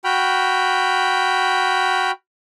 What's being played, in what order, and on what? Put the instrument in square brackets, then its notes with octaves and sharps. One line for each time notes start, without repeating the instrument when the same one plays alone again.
[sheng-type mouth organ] F#4 G5 B5 F6